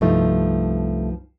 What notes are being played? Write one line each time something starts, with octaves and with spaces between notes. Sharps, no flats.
C2 G2 F3 A3 D#4